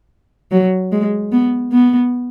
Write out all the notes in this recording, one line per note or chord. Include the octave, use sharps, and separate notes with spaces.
F#3
G#3
B3
B3